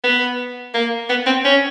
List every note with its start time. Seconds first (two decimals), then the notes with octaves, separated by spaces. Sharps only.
0.04 B3
0.74 A#3
1.10 B3
1.27 C4
1.45 C#4